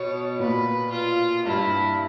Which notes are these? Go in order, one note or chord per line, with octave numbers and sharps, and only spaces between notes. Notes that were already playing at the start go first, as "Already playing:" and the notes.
Already playing: B2 C#5
A#2 B4
F4
G2 E4